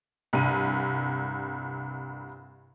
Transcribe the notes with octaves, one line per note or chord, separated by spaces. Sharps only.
C2 G2 D#7